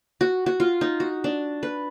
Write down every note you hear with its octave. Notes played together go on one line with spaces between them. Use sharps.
F#4
F#4
F4
D#4
F#4
D4
B4